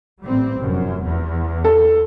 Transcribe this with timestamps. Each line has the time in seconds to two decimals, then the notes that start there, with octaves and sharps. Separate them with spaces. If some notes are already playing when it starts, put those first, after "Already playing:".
0.21 A1 G3 C4
0.59 F1 F#2
1.04 E2
1.64 A4